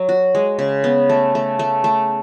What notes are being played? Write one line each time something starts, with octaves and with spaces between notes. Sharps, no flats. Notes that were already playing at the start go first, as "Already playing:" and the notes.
Already playing: F#3
F#4
G#3
C#3
B3
A3
A3
A3
A3